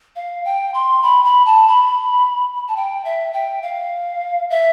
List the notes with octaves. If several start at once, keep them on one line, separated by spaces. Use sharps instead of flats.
F5
G5
C6
B5
B5
A5
B5
A5
G5
E5
G5
F5
E5